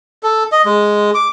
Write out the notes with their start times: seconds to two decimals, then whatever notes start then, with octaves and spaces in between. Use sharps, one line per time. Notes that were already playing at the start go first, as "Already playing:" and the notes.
0.23 A4
0.52 D#5
0.65 G#3
1.14 D6